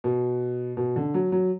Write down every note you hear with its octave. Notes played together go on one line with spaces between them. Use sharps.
B2
B2
D3
F#3
F#3